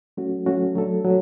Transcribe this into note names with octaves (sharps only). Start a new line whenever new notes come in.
F#3 A3 C#4 F#4
F#3 A3 C#4 F#4
F#3 A3 D4 A4
F#3